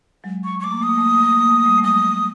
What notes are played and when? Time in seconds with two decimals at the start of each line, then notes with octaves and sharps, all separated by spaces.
0.24 F#3 G#3
0.44 C#6
0.60 C#6
0.64 A3 D6
0.72 A#3
0.81 A3 D#6
0.89 A#3
0.98 A3
1.06 A#3
1.15 A3
1.24 A#3
1.32 A3
1.40 A#3
1.49 A3
1.57 A#3
1.65 G3 A3
1.78 A3
1.83 F#3 G#3 D#6